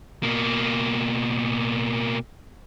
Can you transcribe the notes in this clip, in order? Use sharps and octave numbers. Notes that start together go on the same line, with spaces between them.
B2 A#3